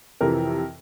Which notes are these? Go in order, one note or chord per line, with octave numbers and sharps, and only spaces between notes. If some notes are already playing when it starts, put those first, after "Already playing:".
F2 C3 E3 A#4